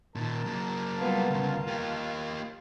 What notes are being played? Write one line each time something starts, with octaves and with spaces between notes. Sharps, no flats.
A#2 D#3 A#4 A5
F#3 A#3
G3 B3 F4
D2 C#3 F4
A#3 G4